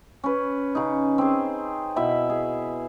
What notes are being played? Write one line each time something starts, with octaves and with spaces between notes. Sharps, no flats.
C#4 B4
C#3 D#4
C4 G#4
B2 E4 E5 B5
G#4